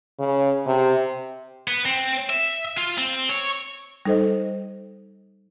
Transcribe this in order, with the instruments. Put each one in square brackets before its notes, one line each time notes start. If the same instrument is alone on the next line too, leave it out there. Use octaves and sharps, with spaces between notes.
[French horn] C#3
C3
[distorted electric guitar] B3
C4
E5
F4
C4
C#5
[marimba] G3 D#4 A4 C5 D#5